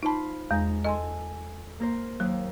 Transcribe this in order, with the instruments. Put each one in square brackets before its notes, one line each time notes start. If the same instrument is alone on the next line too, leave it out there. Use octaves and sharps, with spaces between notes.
[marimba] D#4 A5 [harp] F4 C5 B5
[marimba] E2 [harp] G#3 A#5
[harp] A4 G#5 [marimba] D#5 C6
[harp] A#3 A#4 C5
[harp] D#2 [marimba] F#3